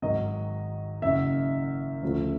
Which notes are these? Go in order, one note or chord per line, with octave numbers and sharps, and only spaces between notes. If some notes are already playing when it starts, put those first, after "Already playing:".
G#1 G#2 D#3 F#3 D#5
F#1 F#2 C#3 F#3 E5
D2 C#3 F3 A3